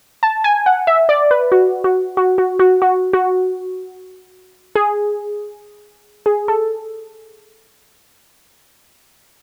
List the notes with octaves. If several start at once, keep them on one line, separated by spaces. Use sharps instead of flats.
A5
G#5
F#5
E5
D5
B4
F#4
F#4
F#4
F#4
F#4
F#4
F#4
G#4
G#4
A4